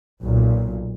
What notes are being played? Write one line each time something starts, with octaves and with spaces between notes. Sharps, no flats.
B1 A#2